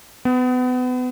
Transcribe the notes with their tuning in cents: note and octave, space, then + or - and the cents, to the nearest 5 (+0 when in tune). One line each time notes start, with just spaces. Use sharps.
B3 +30